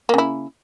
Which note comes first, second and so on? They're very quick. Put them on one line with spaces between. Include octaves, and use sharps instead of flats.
A#3 C#3 E4